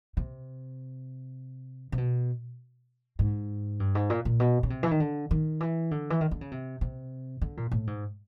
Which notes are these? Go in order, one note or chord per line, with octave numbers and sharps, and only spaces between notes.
C3
C3
B2
G#2
G2
G#2
A#2
A#2
B2
C#3
C3
E3
D#3
D3
D#3
E3
D3
E3
D#3
D3
C#3
C3
C3
D3
A#2
A2
G#2